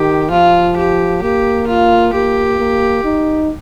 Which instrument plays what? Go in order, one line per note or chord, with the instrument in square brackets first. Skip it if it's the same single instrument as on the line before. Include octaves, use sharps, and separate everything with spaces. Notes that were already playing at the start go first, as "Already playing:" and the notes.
Already playing: [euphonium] D#3 [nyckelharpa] G4
[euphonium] F3 [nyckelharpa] F4
[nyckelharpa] G4
[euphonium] A#3 [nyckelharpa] G4
[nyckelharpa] F4
[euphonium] A#3 [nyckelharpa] G4
[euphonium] A#3
D#4